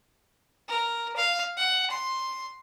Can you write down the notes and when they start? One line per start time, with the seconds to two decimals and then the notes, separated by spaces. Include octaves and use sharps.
0.68 A#4
1.17 F5
1.57 F#5
1.91 C6